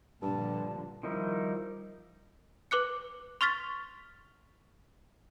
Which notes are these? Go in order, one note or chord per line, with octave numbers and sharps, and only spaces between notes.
G2 A#2 D3 F3 A5
D#3 F3 G3 D#4 E4
B4 D6 F#6 C#7
C6 C#6 F6 A6 B6